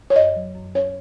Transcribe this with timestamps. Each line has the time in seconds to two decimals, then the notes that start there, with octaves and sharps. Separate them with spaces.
0.10 C#5
0.16 F#2 D#5
0.36 F#3
0.55 F#2
0.75 C#4 C#5